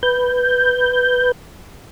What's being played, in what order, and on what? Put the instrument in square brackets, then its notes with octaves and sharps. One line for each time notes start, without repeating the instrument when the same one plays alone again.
[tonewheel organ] B4 G6